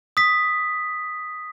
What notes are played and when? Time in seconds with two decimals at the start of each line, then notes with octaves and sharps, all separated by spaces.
0.17 D#6 B6